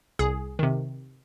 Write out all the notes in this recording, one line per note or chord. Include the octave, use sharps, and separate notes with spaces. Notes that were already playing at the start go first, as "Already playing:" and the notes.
C2 G#4
C3 D#3